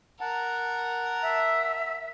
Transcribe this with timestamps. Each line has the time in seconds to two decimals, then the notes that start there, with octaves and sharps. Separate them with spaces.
0.21 A#4 F#5 A5
1.22 E5